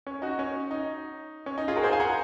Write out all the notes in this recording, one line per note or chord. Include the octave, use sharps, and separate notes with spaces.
C#4
D#4 F#4
C#4
D#4
C#4
D#4
F4 G#4
F#4 A#4
G#4 C5
F5 G#5
F#5 A#5